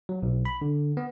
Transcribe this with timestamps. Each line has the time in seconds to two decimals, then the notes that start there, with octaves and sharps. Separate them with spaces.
0.09 F#3
0.23 B1
0.45 B5
0.62 D3
0.97 B3